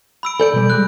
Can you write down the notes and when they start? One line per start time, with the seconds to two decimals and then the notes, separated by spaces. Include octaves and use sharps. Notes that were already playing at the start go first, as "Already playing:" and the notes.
0.23 B5 E6 D7
0.40 A4 D5 G#5 G6 D7
0.53 B2 G3
0.70 G3 G#3 F#6